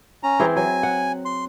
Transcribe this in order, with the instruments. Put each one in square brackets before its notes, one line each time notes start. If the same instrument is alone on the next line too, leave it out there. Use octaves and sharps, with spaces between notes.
[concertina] C#4 A#5
[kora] E3 C4 G#4
[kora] F#3 [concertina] G#5
[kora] F#5
[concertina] C6